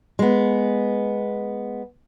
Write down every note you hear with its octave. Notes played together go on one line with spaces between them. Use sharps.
G#3 B3